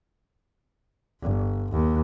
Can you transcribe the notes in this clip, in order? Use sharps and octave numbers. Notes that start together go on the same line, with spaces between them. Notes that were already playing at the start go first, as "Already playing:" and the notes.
G1
D#2